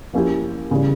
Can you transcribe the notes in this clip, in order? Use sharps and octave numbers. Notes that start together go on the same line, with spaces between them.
F3 A#3 C#4 E4 G4
C#3 E3 G3